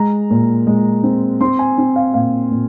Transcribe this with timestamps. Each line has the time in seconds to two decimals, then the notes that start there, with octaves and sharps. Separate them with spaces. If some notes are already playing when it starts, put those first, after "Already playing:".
Already playing: G#3 A#5
0.30 A#2
0.67 G#3
1.03 C4
1.41 C4 C6
1.59 G#5
1.78 C4
1.96 F5
2.14 A#2 F5
2.51 A#2